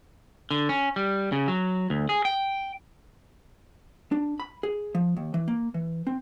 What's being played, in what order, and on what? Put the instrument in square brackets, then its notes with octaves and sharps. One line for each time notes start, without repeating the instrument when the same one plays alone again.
[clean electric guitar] D3
C#4
G3
C#3
F#3
D2
G#4
G5
[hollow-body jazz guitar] D4
B5
G#4
F3
D#2
E3
A#3
E3
C4